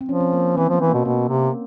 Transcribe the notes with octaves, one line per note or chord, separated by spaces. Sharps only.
C4
F3 C#4
C4
A#3
E3 C4
F3 B3
E3
B2 A#3
B2 A#3
C3